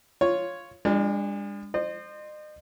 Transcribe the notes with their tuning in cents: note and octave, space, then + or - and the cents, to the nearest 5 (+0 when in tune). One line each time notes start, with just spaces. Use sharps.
F4 +0 C#5 +0
G#3 -40 D4 +0
C5 +0 D#5 -40